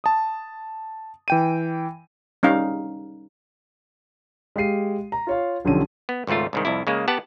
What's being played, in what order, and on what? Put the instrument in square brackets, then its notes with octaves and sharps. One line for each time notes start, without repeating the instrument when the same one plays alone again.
[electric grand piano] A5 D#6
E3 G5 D#7
[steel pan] G3 C#4 D#4 F5
[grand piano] G#3 G4 F5 C7 D#7
A#5
F4 C#5 F5
B1 D3 F3 C#4 G4 D#7
[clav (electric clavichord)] B3
G#1 C#2 G#2 A3 F4
C2 G#2 D#3
C2 F2 E4
C#3 G#3 A#3
B3 G4 F#5 A5